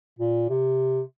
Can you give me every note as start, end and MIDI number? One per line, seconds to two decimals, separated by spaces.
0.19 0.49 46
0.49 1.01 48